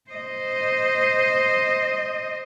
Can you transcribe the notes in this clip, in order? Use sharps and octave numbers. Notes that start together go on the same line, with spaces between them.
C5 D#5